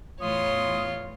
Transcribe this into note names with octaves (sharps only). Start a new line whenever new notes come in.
E2 A2 E3 F4 C#5 C6 D#6